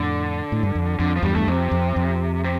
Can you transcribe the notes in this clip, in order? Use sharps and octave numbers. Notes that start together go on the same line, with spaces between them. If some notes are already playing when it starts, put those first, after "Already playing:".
Already playing: F2 A2 D3
A2
G2
F2
F2 D3
F3
E2 G2 G3
G2 A3
F2 C3
F2
F2
C3